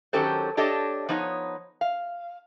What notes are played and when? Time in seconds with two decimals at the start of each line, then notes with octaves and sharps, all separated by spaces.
0.13 D#3 F#3 C#4 G4 A4 C5
0.57 D4 G4 A4 C#5 D#5
1.09 F3 B3 D#4 C#5
1.81 F5